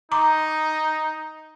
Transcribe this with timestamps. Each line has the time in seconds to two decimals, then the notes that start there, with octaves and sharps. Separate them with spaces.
0.12 D#4 A#5 C6 D6